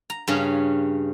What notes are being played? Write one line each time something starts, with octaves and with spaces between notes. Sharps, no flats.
A#5
G2 C#3 C#4